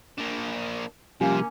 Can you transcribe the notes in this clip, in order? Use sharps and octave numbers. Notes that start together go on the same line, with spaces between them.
A#3 D4
C3 F3 G3 A#3 C#4 G4